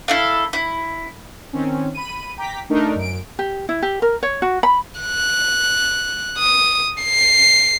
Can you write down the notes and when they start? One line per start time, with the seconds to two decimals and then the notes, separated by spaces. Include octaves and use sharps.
0.08 E4 A4 F5
0.53 E4
1.53 D#3 C4 C#4
1.94 B5 D#7
2.37 G5 A#5 D6 B6
2.70 A3 D4 D#4 A#4
2.95 F#2 D7
3.39 G4
3.69 E4
3.82 G4
4.02 A#4
4.23 C#5
4.42 F#4
4.63 B5
5.01 F#6
6.38 D#6
7.03 C7